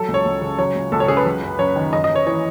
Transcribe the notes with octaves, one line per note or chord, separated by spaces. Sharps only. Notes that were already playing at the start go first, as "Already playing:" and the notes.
Already playing: F#3 A4
C#2
C#5
C#2
C#3
F#3 C#5
C#2
C#2 A4
C#5
C#3 G#4
B4
F#3
F#2
F#2 C#5
D#3
F#2 D#5
D#5
F#2
C#5
E3 C#5